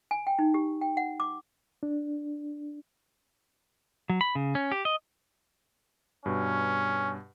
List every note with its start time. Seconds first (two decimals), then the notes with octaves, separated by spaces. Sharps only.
0.11 G#5
0.27 G5
0.39 D#4
0.54 G4
0.81 G5
0.97 F#5
1.20 D6
1.83 D4
4.10 F#3
4.21 B5
4.35 C#3
4.55 C#4
4.72 G4
4.85 D#5
6.26 G2 B2 C#4